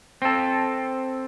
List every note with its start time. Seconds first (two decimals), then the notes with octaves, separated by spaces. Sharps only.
0.22 C4 A4